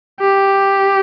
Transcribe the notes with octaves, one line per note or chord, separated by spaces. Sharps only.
G4